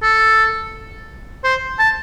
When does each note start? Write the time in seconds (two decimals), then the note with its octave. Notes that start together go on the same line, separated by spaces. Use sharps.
0.03 A4
1.44 C5
1.79 A5